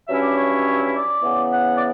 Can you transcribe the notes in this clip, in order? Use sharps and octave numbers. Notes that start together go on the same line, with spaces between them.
G2 F#3 C#4 E4 E5
D5
C#5
D5
C#3 E3 B3
F#5
D5